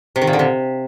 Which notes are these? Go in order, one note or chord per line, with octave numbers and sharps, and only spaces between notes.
C3
D#3
A#2
D3
C3